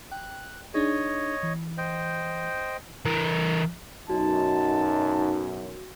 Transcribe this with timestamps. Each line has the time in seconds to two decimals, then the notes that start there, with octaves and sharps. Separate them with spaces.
0.12 G5 F#6
0.74 D4 D#4 G#4 C#5 D#5
1.43 E3
1.78 C5 D#5 G5
3.05 E3 A#4
4.10 B1 F#2 D#4 F#4 A5